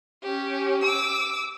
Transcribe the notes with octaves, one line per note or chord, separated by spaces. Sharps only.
C#4 G4
D6 E6